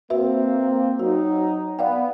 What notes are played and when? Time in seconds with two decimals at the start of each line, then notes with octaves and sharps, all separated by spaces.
0.10 A#3 C4 F#4 B4 E5
0.99 F#3 D#4 F#4
1.79 B3 D5 F5 G5